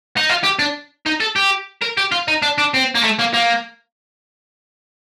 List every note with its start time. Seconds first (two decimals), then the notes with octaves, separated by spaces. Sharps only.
0.17 D#4
0.29 F4
0.43 G4
0.59 D4
1.06 D#4
1.20 A4
1.36 G4
1.82 A#4
1.98 G4
2.12 F4
2.28 D#4
2.42 D4
2.58 D4
2.74 C4
2.95 A#3
3.04 A3
3.19 A#3
3.34 A#3